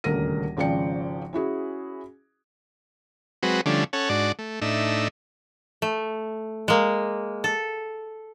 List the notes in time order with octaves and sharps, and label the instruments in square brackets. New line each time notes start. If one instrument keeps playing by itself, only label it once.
[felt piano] D#1 D2 C#3 A#4 A#6 D#7
G#1 C#3 F3 D5 G5 C#7
C#4 E4 F#4 G#4
[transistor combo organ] F#3 G#3 C4 F#4 B4
D3 F3 G3 A3 C#4 D4
C#4 A4 C#5 F#5
G#2 D4 F#4 D5
A3
A2 D4 D#4 E5
[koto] A3
G#3 A#3
A4